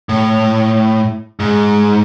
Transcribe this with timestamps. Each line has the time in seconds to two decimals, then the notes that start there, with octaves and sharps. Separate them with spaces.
0.09 A2
1.40 G#2